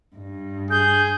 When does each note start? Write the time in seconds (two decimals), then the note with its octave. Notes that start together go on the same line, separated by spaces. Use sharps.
0.16 G2
0.70 G#4 G6